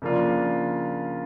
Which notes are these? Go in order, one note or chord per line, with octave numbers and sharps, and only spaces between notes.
C#3 F3 A#3 D4 F4